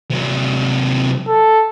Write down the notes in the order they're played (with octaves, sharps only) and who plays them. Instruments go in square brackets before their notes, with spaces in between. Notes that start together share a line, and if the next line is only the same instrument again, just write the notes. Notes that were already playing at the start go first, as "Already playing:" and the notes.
[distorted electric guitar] C3 F#3
[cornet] A4